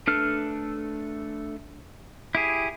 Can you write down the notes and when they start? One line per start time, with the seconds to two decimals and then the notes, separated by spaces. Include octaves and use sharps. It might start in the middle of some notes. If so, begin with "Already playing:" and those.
0.07 A3 D4 A4 B4 F6
2.35 E4 G4 G#4